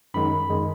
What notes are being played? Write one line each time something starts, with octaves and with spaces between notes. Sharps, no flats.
F#2 D#3 G#3 B5
F#2 D#3 G#3